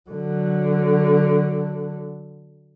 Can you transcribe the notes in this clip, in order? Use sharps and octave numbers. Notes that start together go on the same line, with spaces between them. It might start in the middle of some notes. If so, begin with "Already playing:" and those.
D3 F#3